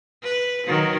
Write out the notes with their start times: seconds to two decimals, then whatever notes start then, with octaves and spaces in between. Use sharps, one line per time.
0.24 B4
0.67 D#3 F#3